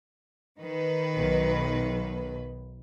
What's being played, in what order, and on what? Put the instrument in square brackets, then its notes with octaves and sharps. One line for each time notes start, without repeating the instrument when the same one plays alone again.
[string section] D#3 B4
[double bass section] B1